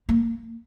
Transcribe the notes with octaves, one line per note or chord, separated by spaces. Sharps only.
A#3